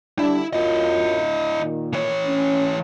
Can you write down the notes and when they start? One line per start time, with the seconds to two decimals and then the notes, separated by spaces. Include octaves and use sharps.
0.19 D3 G3 D4 E4
0.53 F#2 E4 F4 D#5
1.60 A#2 D#3
1.93 E3 C#5
2.26 C#4